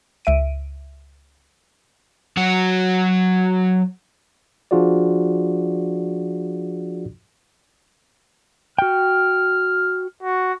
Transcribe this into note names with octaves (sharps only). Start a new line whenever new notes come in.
C#2 E5 D7 D#7
F#3 F#4
F3 D4 F4 F#4 G#4 D5
F#4 G5 F6
F#4